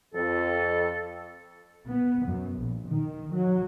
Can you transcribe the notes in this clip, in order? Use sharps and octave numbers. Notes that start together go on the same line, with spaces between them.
F2 A4
B3
F#2
A#1
D#3
F#3